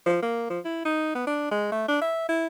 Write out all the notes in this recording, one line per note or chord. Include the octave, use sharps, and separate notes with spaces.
F3
A#3
F3
E4
D#4
B3
D4
G#3
A3
D4
E5
E4